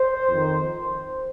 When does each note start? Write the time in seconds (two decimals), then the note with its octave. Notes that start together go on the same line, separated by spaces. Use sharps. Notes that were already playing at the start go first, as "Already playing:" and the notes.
Already playing: C5
0.28 F2 D#3